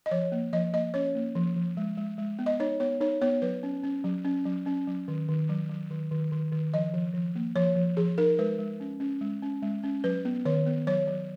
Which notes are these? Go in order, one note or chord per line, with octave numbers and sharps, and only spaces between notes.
D#5
F3 C#5
A#3
F3 D#5
A#3 D#5
C#4 C#5
A#3
F3
F3
G#3
G#3
G#3
B3
D#5
D#4 C#5
B3 C#5
D#4 C#5
B3 C#5
F#3 B4
C#4
C#4
F#3
C#4
F#3
C#4
F#3
D#3
D#3
F#3
F#3
D#3
D#3
D#3
D#3
F3 D#5
F3
F3
A#3
F3 C#5
F3
F3 G#4
D#4 A#4
G#3 B4
G#3
C#4
C#4
G#3
C#4
G#3
C#4
F#3 B4
B3
D#3 C#5
B3
F#3 C#5
F#3